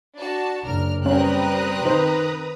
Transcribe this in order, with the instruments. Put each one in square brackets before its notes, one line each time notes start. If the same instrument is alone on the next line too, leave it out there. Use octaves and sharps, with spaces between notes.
[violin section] D4 F#4 A5
[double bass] F#1 D4 [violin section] A#4 F6
[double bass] G3 [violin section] C4 A#4 F#6 [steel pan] C#4 [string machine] B4 A#5 D#6
[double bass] D#3 [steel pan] D#4 C5